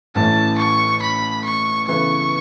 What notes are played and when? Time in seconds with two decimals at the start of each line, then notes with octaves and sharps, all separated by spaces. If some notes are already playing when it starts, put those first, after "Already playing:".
0.15 A1 A2 E3 A3 C#4 A5
0.58 C#6
1.02 B5
1.44 C#6
1.88 C#3 E3 B3 E4 A4 C#6